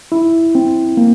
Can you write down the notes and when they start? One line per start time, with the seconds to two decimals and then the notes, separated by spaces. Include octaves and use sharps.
0.12 E4
0.55 C4
0.97 A#3